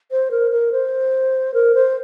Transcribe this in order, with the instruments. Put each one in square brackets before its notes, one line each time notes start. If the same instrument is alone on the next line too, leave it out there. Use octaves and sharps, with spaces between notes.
[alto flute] C5
A#4
A#4
C5
A#4
C5